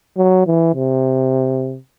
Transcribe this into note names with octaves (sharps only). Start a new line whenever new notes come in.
F#3
E3
C3